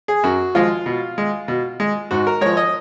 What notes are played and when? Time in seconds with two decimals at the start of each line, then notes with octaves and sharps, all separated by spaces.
0.08 G#4
0.23 F#2 F#4
0.55 F3 G#3 F4
0.86 B2
1.18 G#3
1.48 B2
1.80 G#3
2.11 G#2 F#4
2.27 A#4
2.41 F3 G#3 C#5
2.57 D#5